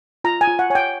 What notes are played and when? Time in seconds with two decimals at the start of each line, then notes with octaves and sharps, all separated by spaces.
0.24 F4 A#5
0.41 G#5
0.47 F4
0.59 F#5
0.70 C#5 G#5
0.75 G5